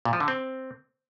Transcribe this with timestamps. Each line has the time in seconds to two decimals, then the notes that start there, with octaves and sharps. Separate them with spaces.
0.05 A#2
0.13 F3
0.20 D3
0.28 C4